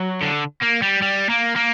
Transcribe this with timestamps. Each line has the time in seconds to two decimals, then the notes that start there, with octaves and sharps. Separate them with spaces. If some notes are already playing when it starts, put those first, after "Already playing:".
Already playing: F#3
0.22 D3
0.63 A#3
0.83 G3
1.02 G3
1.30 A#3
1.56 A#3